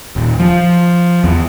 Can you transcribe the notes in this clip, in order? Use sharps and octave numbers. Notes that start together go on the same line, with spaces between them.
D#1
F3
E2